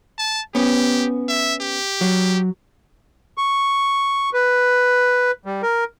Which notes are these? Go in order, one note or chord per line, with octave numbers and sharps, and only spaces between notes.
A5
B3 C#4 G4
E5
G4
F#3
C#6
B4
G3
A#4